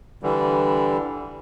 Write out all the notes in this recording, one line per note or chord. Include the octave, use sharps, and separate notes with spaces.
D3 E3 G3